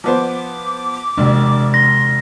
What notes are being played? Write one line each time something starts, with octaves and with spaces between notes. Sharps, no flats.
F3 B3 C5 D6
E1 A#1 C3 G#3 D4
C6 A#6